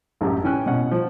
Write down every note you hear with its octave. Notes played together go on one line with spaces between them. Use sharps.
A1 F#2 G4
E3 C#4 G5 G#5 F#6
B2 C#4 F#5
F3